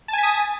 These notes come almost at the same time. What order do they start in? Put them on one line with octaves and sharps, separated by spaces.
A5 G#5 B6 D#6